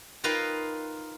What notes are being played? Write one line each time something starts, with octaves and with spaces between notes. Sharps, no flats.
D#4 F4 A#4 B4 F5 G5